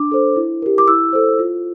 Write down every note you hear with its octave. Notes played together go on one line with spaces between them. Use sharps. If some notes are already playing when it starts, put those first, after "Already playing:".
Already playing: D4 D6
A4 C5
E4
G4 A#4
D6
E4 E6
A4 C5
F4